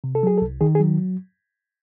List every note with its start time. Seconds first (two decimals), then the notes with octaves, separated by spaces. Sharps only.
0.04 C3
0.15 A4
0.23 F#3 G#4
0.38 A4
0.42 C2
0.61 D#3 G#4
0.75 G#4
0.80 F#3